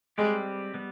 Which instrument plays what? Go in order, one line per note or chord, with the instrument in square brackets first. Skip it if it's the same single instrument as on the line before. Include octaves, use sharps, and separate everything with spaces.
[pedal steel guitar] G3 C4 G4 B4 [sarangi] G#3
[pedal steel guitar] G3 B3